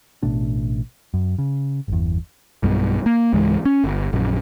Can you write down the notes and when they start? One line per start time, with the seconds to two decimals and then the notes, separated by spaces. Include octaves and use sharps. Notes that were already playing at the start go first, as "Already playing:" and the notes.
0.23 A1 B2 A3 D4
1.14 F#2
1.38 C#3
1.88 G1 E2
2.63 B1 G2 B2
3.06 A#3
3.33 C#2 G#2 E3 G#3
3.65 C#4
3.84 G1
4.13 A#1 F#2